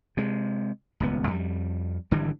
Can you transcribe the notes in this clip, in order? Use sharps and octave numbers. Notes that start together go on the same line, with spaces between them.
C3 G#3
D#1 C#2 B3
F2 G3
G#1 D3 E3 G3